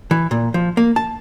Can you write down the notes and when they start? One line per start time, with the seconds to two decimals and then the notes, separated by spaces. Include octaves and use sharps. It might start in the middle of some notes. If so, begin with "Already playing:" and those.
0.11 E3
0.31 A#2
0.54 F3
0.77 A#3
0.96 A5